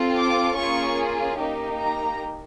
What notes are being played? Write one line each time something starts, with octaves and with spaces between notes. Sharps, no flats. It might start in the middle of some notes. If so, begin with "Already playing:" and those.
Already playing: C4 F4 A4
D6
A#3 C#4 F4 G#4 C#6
A#3 D#4 G4
A#5